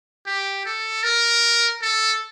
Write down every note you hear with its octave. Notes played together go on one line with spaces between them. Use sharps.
G4
A4
A#4
A4